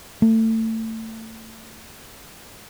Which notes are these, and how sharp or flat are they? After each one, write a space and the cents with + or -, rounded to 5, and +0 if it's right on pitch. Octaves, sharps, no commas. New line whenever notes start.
A3 +25